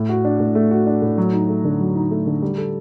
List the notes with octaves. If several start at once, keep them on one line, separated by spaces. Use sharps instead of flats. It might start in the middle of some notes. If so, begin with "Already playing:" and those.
Already playing: A2 A3
F#4
D4
A2
A3
F#4
D4
A2
F#3
D#4
A3
D3
F#3
D#4
A3
D3
G3
A4